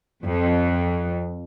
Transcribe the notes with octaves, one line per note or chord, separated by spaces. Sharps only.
F2